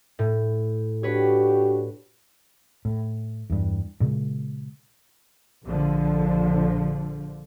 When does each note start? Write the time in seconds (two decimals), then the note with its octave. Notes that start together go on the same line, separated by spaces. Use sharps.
0.19 A2
1.03 D4 F#4 G4 B4 C#5
2.85 A2
3.50 E2 G2
4.00 G2 A#2 C#3 G#3
5.65 A#1 D3 F3